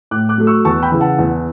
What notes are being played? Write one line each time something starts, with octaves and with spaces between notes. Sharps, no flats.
A2 D6 F#6
D6 F#6
F#3 A3
C#6 E6
E2 A5 C#6
G5 B5
C#3 E3
F#5 A5
E2